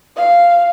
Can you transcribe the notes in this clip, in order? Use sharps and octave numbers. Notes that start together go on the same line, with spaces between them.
F5